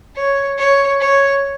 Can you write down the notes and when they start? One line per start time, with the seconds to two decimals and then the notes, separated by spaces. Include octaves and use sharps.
0.16 C#5
0.58 C#5
1.00 C#5